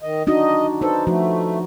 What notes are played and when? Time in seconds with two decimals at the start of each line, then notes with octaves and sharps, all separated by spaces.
0.02 D#3 D#5
0.27 D4 D#4 F#4 D#5
0.82 D#4 A4 B4 C5
1.07 F3 A3 F#4